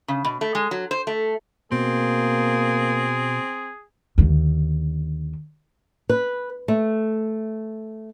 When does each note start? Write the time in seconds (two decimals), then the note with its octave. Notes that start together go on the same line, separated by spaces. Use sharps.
0.08 C#3
0.25 B2
0.41 A3
0.55 G#3
0.71 F#3
0.91 C5
1.07 A3
1.72 B2 A#3 C4 G#4
4.18 D#2 D3
6.09 B4
6.68 A3